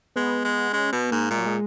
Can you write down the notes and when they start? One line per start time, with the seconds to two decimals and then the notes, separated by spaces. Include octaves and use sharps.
0.16 G#3 B3
0.45 G#3
0.73 G#3 C#4
0.92 B2 B3
1.11 G#2 A#3
1.31 A#2 G#3
1.39 F#3
1.46 G#3